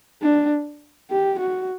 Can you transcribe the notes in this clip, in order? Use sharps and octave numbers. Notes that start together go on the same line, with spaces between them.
D4
G4
F#4